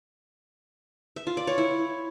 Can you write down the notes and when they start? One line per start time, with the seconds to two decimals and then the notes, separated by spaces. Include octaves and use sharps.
1.16 E5
1.27 F4
1.37 D5
1.47 C#5
1.58 E4